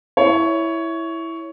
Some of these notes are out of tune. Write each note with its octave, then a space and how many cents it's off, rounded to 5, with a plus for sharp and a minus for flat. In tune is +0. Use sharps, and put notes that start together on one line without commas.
E4 +0 C#5 +10